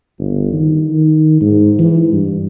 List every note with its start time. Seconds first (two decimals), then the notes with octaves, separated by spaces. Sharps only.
0.19 G1
0.53 D#3
0.90 D#3
1.41 G#2
1.79 E3
2.12 G2